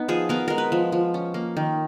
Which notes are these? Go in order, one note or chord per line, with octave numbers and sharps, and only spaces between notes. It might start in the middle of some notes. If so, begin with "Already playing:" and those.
Already playing: B3 D#4
F3 G#4
B3 A#4
G#3 A#4
B4
F3
F3
C#4
A#3
D#3